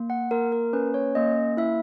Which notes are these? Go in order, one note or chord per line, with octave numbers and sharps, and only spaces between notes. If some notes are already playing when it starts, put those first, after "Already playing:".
Already playing: A#3
F#5
A#3 A#4
A#4
C#4 B4
C#5
A#3 D#5
E4 E5